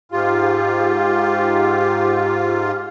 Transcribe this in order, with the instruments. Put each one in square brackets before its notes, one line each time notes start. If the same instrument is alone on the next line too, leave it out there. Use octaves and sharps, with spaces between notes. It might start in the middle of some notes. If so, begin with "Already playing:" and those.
[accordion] G#2 F4 [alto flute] G4